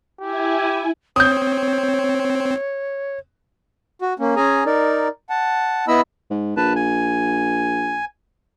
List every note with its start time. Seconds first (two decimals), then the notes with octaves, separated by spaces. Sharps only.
0.20 E4 G4 G#5
1.16 C4 C#5 D#6 G6
4.02 F#4
4.19 A#3 C#4
4.36 C#4 G#4 G#5 A#5
4.66 D#4 A#4 D5
5.30 F#5 A5
5.88 B3 E4 D#5 B5 E6
6.30 G#2
6.57 A#1 B4 A5
6.76 G#5